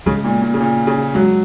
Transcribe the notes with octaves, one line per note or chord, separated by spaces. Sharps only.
C#3 G#3
A#2
A#2
C#3
A#2
C#3
F#3 G#3